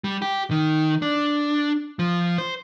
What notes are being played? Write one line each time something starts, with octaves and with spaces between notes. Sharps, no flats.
G3
G4
D#3
D4
F3
C5